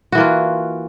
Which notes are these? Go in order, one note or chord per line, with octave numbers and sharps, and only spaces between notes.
E3 A#3 F4 F#4